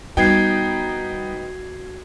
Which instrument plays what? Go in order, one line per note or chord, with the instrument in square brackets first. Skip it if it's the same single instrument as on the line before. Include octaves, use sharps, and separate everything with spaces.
[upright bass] G3 [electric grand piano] B3 D#4 G5 [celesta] F#4 G#6 C7